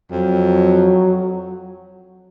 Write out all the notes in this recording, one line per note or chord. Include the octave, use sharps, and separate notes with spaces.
F2 F#3